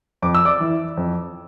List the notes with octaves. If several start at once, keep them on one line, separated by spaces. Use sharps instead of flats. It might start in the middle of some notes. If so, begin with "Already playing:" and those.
F2 D6
E6
D5 D6
E3
F2